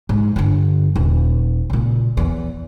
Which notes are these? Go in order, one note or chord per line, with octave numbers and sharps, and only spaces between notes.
G#2
G2 D3
D#1
C#2 A#2
E2